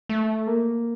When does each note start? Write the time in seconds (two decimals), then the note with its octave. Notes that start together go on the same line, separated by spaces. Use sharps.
0.09 A3
0.47 A#3